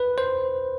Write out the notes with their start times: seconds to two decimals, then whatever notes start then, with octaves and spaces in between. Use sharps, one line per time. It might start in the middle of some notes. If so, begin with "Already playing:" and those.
Already playing: B4
0.18 C5